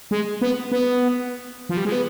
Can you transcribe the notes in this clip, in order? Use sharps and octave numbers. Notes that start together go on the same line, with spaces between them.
G#3
B3
B3
F3
G3
G#3
B3